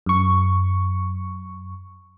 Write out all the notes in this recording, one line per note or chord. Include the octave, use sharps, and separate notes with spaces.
F#2 C#6